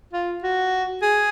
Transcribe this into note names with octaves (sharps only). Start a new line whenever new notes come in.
F4
F#4
G#4